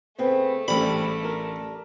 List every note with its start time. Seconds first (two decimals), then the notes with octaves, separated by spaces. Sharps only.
0.18 C#3 A3 B3 C4
0.68 A1 G#2 G3 D4 B5
1.23 D4 A#4